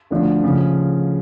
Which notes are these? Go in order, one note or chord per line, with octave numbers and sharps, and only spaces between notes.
D2 D3 F3 A3 D4
C#3 F3